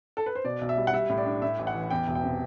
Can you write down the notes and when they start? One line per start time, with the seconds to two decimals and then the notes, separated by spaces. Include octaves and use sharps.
0.17 A4
0.26 B4
0.35 C5
0.45 B2 D5
0.61 B1
0.69 E5
0.77 G3
0.87 F#5
0.93 G3 E5
1.09 A2
1.17 D5
1.26 D4
1.42 A2 E5
1.59 A1
1.67 F#5
1.74 E3
1.90 E2 G5
2.08 E1
2.15 G5
2.24 C3